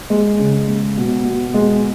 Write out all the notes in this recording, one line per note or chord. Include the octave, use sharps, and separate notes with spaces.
G#3
C#3
G#3
B2
B2
G#3